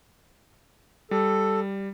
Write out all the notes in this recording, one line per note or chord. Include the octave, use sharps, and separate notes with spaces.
G3 A4